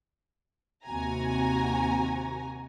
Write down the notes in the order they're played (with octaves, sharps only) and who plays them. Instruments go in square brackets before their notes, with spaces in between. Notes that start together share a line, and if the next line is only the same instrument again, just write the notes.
[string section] D#2 C3 F#4 G#5 A#5